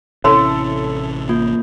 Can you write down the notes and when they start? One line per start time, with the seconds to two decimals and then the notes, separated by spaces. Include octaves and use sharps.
0.24 A1 C3 C#4 E4 A4 C#5 B5 C6
1.29 A#3 F4